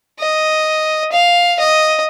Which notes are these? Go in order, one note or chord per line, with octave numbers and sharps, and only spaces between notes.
D#5
F5
D#5